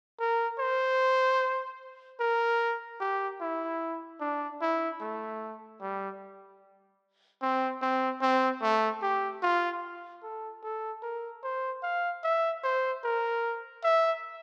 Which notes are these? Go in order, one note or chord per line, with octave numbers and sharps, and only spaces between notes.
A#4
C5
A#4
G4
E4
D4
E4
A3
G3
C4
C4
C4
A3
G4
F4
A4
A4
A#4
C5
F5
E5
C5
A#4
E5